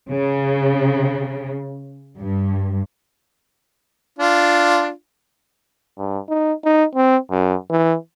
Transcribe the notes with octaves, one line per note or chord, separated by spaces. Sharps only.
C#3
G2
D4 F4
G2
D#4
D#4
C4
F#2
E3